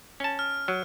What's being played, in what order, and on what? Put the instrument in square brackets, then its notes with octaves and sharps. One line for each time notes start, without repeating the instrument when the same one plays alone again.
[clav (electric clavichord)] C#4 A5
[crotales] F6
[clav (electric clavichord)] F#3